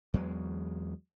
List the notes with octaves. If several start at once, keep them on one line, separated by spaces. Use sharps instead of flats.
E2 F#3 G#3